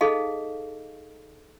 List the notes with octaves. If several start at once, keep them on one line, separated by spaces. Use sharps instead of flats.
D#4 G#4 A4 D#5 F5